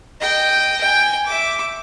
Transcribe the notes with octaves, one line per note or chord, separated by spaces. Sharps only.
D#5 G5
G5 G#5
E5 D6